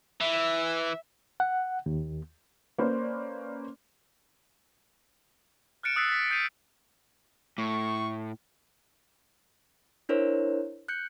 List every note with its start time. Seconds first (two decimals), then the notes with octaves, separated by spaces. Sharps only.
0.20 E3 E5
1.40 F#5
1.86 D#2
2.78 A#3 C#4 B4 C5 D5
5.83 F6 F#6 A6 C#7 D7 E7
5.96 D#6 E6 F#6 A6 B6 C7
6.08 A6 B6
6.30 D#6 G6 B6 C7 D#7 F7
7.58 A2 C#6
10.09 D4 E4 A#4 C5 C#5
10.88 F#6 G6 C#7